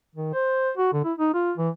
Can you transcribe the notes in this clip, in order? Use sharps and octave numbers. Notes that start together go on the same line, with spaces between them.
D#3
C5
F#4
D3
E4
D#4
F4
E3